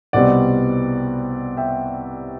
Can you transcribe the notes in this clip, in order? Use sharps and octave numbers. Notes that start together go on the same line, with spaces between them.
C2 B2 G3 C4 D5 F#5
E5 G5